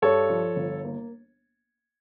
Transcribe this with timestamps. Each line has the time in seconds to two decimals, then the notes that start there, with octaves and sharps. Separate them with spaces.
0.02 G2 A4 C#5
0.29 F3
0.56 G1
0.84 A#3